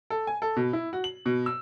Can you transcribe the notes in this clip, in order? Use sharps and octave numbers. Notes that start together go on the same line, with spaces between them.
A4
G#5
A4
B2
E4
F#4
F#7
B2
E6